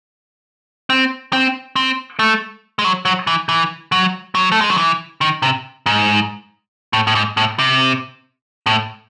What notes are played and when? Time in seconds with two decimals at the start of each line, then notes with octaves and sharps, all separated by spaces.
0.90 C4
1.33 C4
1.76 C4
2.19 A3
2.79 G#3
2.84 F#3
3.05 F#3
3.27 E3
3.49 E3
3.92 F#3
4.35 F#3
4.52 A3
4.61 G#3
4.70 F#3
4.77 E3
5.21 D#3
5.42 C3
5.86 G#2
6.93 A2
7.07 A2
7.15 G#2
7.37 A2
7.59 C3
8.66 A2